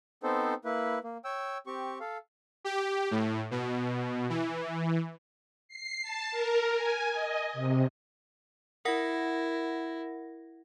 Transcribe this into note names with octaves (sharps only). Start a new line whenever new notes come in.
B3 C4 D#4 A4 C5
A#3 E4 B4
A#3
C#5 G5 E6
C4 G4 C#6
A4 F5
G4
A2
B2
E3
C7
A5
A#4
G#5
D#5
C3
E4 A#4 F#5 A#6